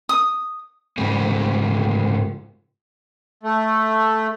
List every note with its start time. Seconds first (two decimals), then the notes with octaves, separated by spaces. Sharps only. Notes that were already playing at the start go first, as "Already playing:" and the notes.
0.09 D#6
0.98 G#2 C#3 G3 A#3
3.43 A3